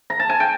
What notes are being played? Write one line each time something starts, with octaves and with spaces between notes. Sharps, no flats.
A#5
A5
G#5
G5